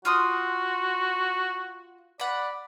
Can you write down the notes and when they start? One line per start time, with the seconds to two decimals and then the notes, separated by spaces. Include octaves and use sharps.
0.05 F4 F#4 C6 D#6
2.20 D5 F#5 B5